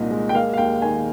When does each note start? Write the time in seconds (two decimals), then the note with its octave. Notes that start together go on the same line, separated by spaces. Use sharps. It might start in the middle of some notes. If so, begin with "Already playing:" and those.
Already playing: C2 A#2 D#4
0.11 G#3
0.29 G5
0.34 A#3 F5
0.54 F5
0.58 D#2 G5
0.82 D#3 G#5